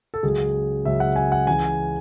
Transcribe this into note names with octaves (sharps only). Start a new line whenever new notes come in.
A4
C#2 C#3 F#3 G#4
C#2 C#3 F#3 E5
F#5
G#5
F#5
C#2 C#3 E3 G#5